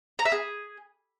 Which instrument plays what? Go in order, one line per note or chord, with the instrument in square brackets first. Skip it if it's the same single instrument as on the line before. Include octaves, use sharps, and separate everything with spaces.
[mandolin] A#5
E5
G#4